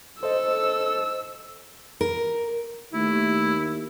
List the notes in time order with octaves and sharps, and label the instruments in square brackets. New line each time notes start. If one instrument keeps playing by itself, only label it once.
[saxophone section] A4 [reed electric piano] C5 D#5 [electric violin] E6
[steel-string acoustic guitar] A#4
[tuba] D#2 [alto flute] A3 [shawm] E4